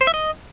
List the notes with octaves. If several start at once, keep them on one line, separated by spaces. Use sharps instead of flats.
C5
E5
D#5